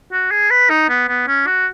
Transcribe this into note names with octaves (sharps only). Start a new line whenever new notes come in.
F#4
G#4
B4
D#4
B3
B3
C#4
F#4